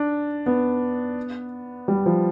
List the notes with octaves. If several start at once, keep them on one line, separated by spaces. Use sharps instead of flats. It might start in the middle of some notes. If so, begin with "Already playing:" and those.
Already playing: D4
B3
G3
F3